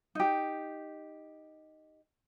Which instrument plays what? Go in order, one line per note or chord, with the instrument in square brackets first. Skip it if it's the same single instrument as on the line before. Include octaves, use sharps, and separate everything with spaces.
[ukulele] D#4 G4